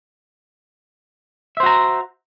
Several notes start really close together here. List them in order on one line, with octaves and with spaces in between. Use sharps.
E5 C5 F#4 A#5